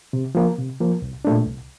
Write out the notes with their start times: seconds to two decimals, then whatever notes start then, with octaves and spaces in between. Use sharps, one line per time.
0.13 C3
0.35 F3 A#3
0.58 C3
0.81 F3 A#3
1.02 C2
1.25 A#2 A3 D4
1.47 C2